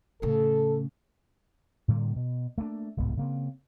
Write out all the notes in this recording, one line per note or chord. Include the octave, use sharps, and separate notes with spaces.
A2 C#3 A4
A2 D3 G3 A#3
B2
A3 A#3 C4 D4
D1 C2 G#2 B3
C#3 A#3 C4